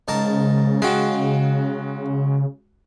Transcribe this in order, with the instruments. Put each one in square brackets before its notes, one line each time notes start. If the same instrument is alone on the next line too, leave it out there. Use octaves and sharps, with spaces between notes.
[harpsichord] G#2 A#4 A5 [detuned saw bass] C#3
[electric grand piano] G#3 F#4 [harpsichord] F5 G5